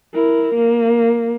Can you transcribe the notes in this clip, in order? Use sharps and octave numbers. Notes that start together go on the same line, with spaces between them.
E4 A#4
A#3